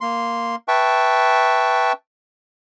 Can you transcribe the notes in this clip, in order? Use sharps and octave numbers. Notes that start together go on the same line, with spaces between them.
A#3 C6
B4 E5 G5 A5 C#6